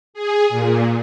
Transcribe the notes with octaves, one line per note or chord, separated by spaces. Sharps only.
G#4
A#2